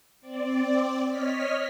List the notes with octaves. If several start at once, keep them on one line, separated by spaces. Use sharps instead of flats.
C4 D5
C#5 D#5 F6 B6